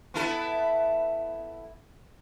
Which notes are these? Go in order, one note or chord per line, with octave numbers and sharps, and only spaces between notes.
B3 E4 A4